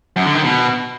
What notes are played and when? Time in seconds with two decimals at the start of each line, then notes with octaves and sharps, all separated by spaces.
0.16 F#2
0.26 D3
0.35 D#3
0.44 B2